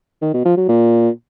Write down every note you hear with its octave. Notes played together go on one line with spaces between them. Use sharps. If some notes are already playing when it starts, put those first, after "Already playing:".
D#3
B2
F3
F#3
A#2